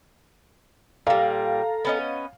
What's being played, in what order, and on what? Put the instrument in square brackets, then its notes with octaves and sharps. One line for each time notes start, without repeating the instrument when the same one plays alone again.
[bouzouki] A#2 G3 [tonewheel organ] A4 A#5 [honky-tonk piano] F5
[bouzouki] B3 C#4 D#5